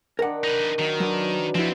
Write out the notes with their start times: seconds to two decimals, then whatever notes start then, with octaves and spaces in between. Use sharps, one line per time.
0.19 D#3 D4 A#4 F#5
0.44 D#4 B4
0.79 D#3 F#3 D#4
1.00 F#3 D4 B4
1.55 F3 B3 C4 E4 F4